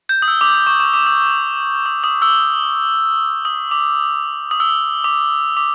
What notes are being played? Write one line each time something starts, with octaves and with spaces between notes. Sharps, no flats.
G6
D#6
E6
D6
D6
C#6
C#6
D6
D#6
D#6
D#6
E6
D#6
D6
D#6
E6
D#6
D6
D6